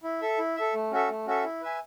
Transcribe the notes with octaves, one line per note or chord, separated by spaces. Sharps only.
E4
A4 E5
E4
A4 E5
A3
C#4 F#4 A4 E5
A3
C#4 F#4 A4 E5
E4
B4 E5 G#5